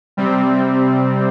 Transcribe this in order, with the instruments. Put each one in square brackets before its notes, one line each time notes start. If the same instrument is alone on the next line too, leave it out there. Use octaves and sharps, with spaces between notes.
[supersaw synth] C3 G3 C4